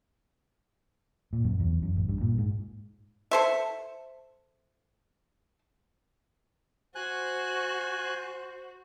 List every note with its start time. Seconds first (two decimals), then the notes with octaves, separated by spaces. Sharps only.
1.33 A#2
1.44 F#2
1.60 E2
1.82 F#2
1.96 A1
2.09 G2
2.21 A#2
2.38 G#2
3.31 A4 C5 E5
6.95 F#4 C5 G#5 F#6